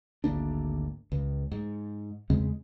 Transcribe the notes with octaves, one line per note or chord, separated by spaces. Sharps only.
G#1 D2 A#3 D4
C#2
G#2
E2 C#3 G#3 C4